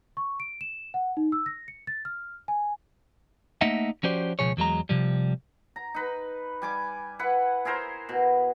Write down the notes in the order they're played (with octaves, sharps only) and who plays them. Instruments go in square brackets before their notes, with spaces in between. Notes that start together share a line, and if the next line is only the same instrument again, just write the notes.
[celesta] C#6
D7
E7
F#5
D#4
E6
A#6
C#7
A6
F6
G#5
[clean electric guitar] A3 A#3 D#4 D#5 E5 F#5
F3 C#4 F#4 G4 C5 D5
C#2 F#2 B2 F3 G#4 C#5
E2 F#3 G#3 A#5
C3 F3 G3
[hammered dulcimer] A#5
D#4 B4
G3 G#5 D6
E4 B4 F#5
E4 G#4 A#4 C5
B2